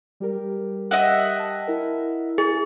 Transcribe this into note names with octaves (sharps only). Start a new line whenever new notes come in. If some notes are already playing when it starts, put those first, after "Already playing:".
G3 G4 A#4
D#5 E5 F#5
G5 A5
E4 A#4
G#4